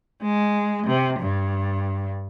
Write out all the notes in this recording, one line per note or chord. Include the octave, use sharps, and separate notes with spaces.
G#3
C3
G2